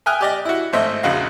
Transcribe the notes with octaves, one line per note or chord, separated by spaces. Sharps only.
E5 G5 G#5 D#6 F6 F#6
G4 D5 D#5
E4 F#4
G#1 A3 C5 D#5 E5
A#1 E2 C#3 F#4 D#5 F5